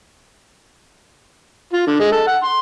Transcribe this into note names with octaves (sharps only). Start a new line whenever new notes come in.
F4
D3
G#3
A4
F#5
C6